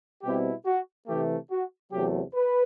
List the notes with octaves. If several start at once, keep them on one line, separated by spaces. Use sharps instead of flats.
B2 G3 C4 E4 G4
F#4
C3 E3 A3 G4
F#4
E2 C3 F#3 A3 G4
B4